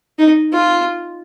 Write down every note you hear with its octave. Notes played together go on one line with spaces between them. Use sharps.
D#4
F4